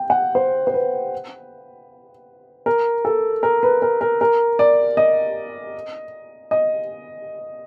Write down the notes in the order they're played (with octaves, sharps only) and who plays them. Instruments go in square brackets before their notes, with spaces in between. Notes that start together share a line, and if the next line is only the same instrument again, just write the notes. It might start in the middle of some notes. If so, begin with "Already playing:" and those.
Already playing: [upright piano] G5
F#5
C5
C5
B4
A#4
A4
A#4
B4
A#4
A#4
A#4
D5
D#5
D#5